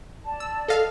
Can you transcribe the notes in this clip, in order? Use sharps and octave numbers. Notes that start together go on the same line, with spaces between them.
D5 A5
E6
A4 D#5 F5